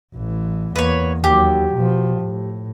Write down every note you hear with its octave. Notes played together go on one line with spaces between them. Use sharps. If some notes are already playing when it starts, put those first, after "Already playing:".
A1 E3
E2 A#3 B4 C#5
D#2 F#3 G4
B2 F3
A2